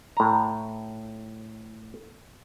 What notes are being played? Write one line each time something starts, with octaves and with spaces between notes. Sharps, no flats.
A2 A#5